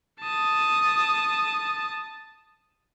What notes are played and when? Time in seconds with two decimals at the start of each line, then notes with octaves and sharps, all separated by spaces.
0.20 A5 D#6